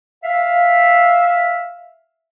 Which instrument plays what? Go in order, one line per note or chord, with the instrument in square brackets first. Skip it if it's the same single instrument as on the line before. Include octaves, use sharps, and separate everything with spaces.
[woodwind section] E5 F5